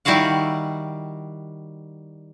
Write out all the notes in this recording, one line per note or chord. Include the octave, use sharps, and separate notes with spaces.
D#3 G3 E4 F#4 F5 F#5